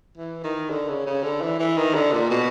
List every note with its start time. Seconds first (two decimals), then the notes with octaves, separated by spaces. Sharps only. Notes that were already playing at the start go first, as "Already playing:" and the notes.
0.18 E3
0.44 D#3
0.70 D3
0.88 C#3
1.07 C#3
1.23 D3
1.42 E3
1.60 E3
1.77 D#3
1.95 D3
2.12 A#2
2.30 B2